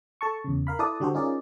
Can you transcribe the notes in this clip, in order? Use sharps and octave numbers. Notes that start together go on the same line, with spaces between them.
A4 A5 C#6
E2 C#3
A#4 F5 B5
E4 A4 B4 D5 D#6
D3 G3 F#4 G4 A4 C5
C#4 D#4 F4 G#4 A#4 D5